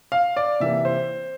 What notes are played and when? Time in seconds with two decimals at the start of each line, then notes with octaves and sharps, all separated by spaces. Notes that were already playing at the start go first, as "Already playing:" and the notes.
0.12 F5
0.36 D5
0.60 C3 E3 A#3 E5
0.85 C5